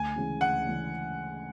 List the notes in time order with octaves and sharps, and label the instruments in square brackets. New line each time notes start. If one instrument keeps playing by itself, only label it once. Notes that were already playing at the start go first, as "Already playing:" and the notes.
Already playing: [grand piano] D2 [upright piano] G#5
[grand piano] C#3 E3 G#3
[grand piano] D2 [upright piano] F#5
[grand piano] C#3 E3 G#3